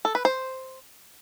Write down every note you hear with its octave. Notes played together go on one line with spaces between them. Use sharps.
A4
B4
C5